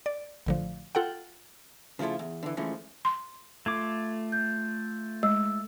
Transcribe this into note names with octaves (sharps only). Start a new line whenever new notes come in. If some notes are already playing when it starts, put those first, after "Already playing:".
D5
A1 D3 F3
F4 A4 F#5 G5
C#3 F3 A3 E4 F4
E2
D3 E3
E3 F3 G#3 A3 C#4
C6
A3 F4 D6 G#6
G6
G#3 E6